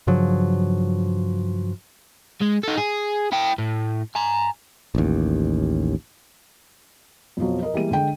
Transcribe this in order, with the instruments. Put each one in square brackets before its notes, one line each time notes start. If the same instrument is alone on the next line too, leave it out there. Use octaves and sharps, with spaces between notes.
[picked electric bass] G2 C#3 F3 F#3
[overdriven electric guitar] G#3
D#4 A4
G#4
E4 G5
A2
G#5 A#5
[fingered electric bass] A1 D#2
[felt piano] F2 B2 F3 F#3
A#4 D#5
E3 G3 G#3 A#3 D#7
D3 G#3 G5